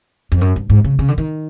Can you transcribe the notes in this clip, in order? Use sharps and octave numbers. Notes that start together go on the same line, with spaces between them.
F2
F#2
G2
G#2
C#3
C#3
D3
D#3